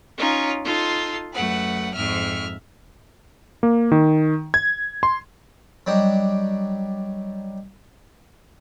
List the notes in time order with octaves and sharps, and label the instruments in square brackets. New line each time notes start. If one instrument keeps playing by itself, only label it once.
[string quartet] C#4 D#4 F4
D#4 F4 A4 C6
F#2 A3 B4 F#5
F2 G#2 E5 F6
[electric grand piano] A#3
D#3
G#6
C6
[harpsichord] F#3 G3 D4 G4 D#5